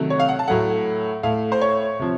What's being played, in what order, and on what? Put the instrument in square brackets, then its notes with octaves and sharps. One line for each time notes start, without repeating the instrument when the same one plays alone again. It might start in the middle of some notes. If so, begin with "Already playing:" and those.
Already playing: [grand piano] C3 D#3 F#3 A3
C#5
F5
F#5
A5
A2 F#3 A3 F#5
A2 A3 F5
C5
C#5
C3 F3